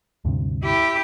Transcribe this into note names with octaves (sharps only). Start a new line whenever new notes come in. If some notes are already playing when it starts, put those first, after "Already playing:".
D2 G2 C3
E4 G4